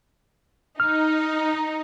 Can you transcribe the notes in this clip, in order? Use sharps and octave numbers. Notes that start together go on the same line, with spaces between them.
D#4 F6